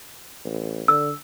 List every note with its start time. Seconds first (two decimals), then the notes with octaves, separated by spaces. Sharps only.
0.45 A1
0.88 D3 E6